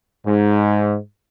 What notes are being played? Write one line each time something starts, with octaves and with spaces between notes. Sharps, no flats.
G#2